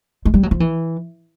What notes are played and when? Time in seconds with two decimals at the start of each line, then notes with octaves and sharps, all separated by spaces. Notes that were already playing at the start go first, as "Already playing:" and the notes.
0.25 G#3
0.34 G3
0.43 F#3
0.51 F3
0.60 E3